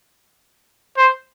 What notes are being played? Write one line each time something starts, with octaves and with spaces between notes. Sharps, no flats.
C5